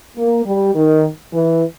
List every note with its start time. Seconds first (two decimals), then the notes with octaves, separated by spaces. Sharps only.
0.17 A#3
0.46 G3
0.75 D#3
1.32 E3